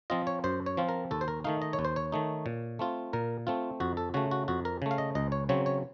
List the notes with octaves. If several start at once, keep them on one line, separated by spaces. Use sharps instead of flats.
F3 C4 F4 D#5
C#5
F#2 C5
C#5
F3 C4 F4
A#4
D#2 A4
C5
A#4
D#3 A3 D#4 F5
D#5
C#5
D#2
C5
C#5
D#3 A3 D#4
A#2
A3 C4 F4
A#2 A#4
A3 C4 F4
F2 F#4
A4
C#3 A3 F#4
F#4
F2 F#4
A#4
C#3 A3
F5
D#5
C#2 D#5
C#5
C#3 F#3 C4 C#5
C#5